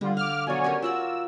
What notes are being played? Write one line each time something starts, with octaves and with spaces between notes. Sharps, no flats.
D3 G3 F4
F5 C6 D6 F6
B2 F#3 C#5 D5 G#5
C#4 G4 A#4
F4 F#4 D5 E6